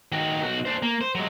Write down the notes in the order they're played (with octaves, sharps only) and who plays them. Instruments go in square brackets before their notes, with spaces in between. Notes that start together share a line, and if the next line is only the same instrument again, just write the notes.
[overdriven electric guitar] D#3 F#4
B1 F#4
D4 C5
A#3
C5
F#3 G#3